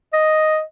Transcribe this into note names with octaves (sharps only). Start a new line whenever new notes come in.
D#5